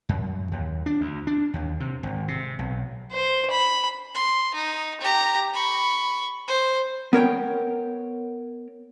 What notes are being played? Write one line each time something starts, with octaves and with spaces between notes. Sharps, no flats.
F#2
D#2
D4
D2
D4
D#2
C3
G#1
C3
B1
C5
B5
C6
D#4
G4 A#5
B5 C#6
C5
B3 A#4 C#5 G5